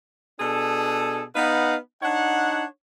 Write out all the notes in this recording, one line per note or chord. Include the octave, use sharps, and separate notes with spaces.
B2 D4 G#4 A4
B3 D#4 B4 F5 F#5
D4 D#4 C#5 F#5